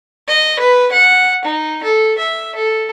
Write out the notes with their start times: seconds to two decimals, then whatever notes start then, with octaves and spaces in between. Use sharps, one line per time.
0.27 D#5
0.59 B4
0.92 F#5
1.44 D#4
1.83 A4
2.18 E5
2.55 A4